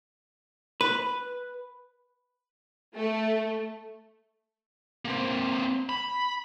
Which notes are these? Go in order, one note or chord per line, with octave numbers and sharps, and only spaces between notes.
B4
A3
A#3 C4
B5